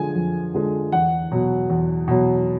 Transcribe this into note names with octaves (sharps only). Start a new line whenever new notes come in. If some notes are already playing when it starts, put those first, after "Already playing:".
Already playing: D3 F3 G#3 G#5
F2
D3 F3 G#3
E2 F#5
B2 F#3
E2
B2 F#3